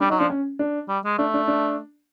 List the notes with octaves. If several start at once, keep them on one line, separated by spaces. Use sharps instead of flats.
G3 D4
F#3 D#4
F3 D4
C#4
D4
G3
G#3
A3 D4
D4
D4